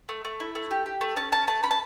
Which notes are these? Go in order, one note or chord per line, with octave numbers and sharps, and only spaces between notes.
A3
A3
E4
A3
G4
G4
A3
C#4 A5
C#4 A5
A3 A5
C#4 B5
A5